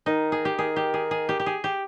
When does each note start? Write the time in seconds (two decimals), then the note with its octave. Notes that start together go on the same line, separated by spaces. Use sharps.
0.06 D#3 D#4
0.32 G#4
0.45 G4
0.59 D#3 G#4
0.76 G4
0.94 G#4
1.11 G#4
1.29 G4
1.40 G4
1.46 G#4
1.64 G4